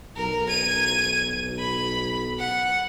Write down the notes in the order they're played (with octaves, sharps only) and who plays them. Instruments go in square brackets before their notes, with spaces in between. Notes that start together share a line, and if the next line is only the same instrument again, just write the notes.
[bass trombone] B1 [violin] A#4
[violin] G#6 D#7
B5
F#5